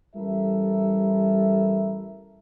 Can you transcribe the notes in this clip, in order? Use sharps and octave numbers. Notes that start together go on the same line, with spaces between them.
A1 G3 E4 A4 A#4 E5